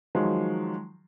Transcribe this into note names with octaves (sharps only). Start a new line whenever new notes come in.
D#3 F3 F#3 G#3